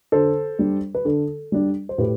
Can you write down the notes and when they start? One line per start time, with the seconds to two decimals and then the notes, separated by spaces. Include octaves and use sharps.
0.12 D3 A4 C5
0.59 G3 D4
0.95 B4
1.05 D3 A4
1.52 G3 D4
1.89 C5
1.98 A2 G4 B4